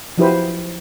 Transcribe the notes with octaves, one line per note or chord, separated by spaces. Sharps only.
F3 F#3 E4 G4 B4 C5